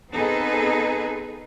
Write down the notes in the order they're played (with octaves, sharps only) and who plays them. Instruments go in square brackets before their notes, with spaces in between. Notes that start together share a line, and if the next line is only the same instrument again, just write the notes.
[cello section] B3 C4 D#4 G#4 A4 B4